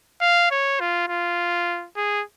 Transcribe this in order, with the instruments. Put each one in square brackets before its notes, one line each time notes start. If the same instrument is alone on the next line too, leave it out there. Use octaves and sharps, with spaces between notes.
[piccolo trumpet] F5
C#5
F4
F4
G#4